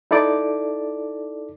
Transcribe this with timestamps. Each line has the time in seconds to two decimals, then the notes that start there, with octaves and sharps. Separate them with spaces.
0.11 D#4 E4 A4 D5 D6